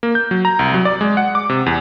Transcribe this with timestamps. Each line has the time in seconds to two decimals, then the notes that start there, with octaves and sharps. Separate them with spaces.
0.03 A#3
0.15 G6
0.31 F#3
0.45 A#5
0.59 C2
0.74 F#3
0.85 D5
1.01 G#3
1.17 F#5
1.35 D6
1.49 C3
1.66 E2